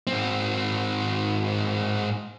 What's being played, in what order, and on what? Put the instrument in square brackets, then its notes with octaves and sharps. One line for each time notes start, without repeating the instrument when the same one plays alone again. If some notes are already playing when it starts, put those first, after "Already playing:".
[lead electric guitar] G#2 C4